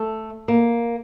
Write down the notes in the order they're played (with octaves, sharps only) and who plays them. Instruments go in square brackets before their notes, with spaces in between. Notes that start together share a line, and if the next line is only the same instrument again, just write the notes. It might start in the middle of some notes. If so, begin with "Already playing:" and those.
Already playing: [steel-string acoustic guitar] A3
A#3